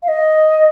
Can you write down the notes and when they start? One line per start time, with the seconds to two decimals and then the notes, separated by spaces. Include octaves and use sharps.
0.02 F5
0.08 D#5